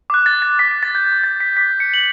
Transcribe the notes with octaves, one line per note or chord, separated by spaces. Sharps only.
D6 F#6
A6
A6
D6 F#6 B6
B6
A6
G6
F#6
D6
A6
B6
D6 F#6 B6
C#7
F#7